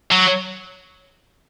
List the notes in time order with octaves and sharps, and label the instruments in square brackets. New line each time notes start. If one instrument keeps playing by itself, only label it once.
[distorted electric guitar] F#3